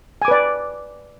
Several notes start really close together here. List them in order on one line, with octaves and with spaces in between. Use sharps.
G#5 D6 B4 D5